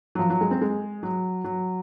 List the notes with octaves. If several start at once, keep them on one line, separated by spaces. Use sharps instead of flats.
F#3
F3
F#3
G#3
C4
G#3
F#3
F#3